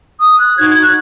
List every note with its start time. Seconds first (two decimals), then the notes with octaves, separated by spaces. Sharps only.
0.21 D#6
0.39 F#6
0.57 D#4 F#4 C#5 G#6
0.70 G#6
0.82 F#6